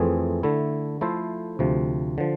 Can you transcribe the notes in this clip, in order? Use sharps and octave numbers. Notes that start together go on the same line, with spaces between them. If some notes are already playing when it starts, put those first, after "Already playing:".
Already playing: F2 E3 A3 C4 G#4
D3 A3 E4
F3 A3 E4 A4 C5
D2 C3 F3
D3 F3